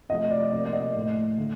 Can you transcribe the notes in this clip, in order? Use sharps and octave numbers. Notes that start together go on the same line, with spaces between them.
C3 F3 A3 D#5
D5
C3 F3 A#3 D5
D5
D#5
A2 A3
D3 A3